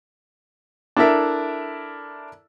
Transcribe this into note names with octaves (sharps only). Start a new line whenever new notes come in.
D4 E4 A4 A#4 E5